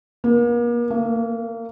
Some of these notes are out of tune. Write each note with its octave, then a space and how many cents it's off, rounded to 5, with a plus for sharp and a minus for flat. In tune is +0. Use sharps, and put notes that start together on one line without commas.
A#3 +40
A#3 -30